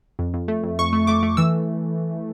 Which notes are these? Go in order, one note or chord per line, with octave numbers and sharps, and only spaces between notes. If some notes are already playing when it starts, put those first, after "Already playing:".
F2
F2
A3
F2
F2 C#6
A3
A3 D6
A3
E3 E6